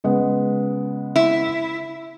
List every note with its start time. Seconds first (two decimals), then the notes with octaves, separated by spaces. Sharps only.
0.04 C#3 G#3 B3
1.16 E4